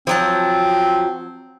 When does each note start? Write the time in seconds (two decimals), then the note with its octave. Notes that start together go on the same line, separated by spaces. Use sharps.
0.07 F3 F#3 C4 A5